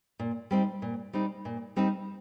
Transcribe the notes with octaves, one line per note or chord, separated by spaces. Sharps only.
A#2
G3 C4 D#4
A#2
G3 C4 D#4
A#2
G3 C4 D#4